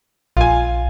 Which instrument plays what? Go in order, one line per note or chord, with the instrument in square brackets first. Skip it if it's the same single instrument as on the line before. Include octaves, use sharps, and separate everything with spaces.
[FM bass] A#1 [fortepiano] F4 G#5